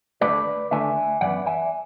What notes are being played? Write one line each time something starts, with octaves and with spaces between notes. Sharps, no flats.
D2 D3 A3 D4 B4 D5
D2 D3 A3 D4 E5 G#5
F#2 E3 B3 D5 F#5
E5 G#5